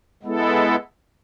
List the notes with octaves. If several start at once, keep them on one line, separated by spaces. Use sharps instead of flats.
G#3 B3 E4 A4